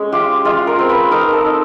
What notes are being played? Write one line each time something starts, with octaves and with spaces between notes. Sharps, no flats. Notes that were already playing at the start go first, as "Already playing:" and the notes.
Already playing: G#3 C#4
F4 G4
G#3 F4
A#4
C4
B4
D#4 A#4
A4
D#4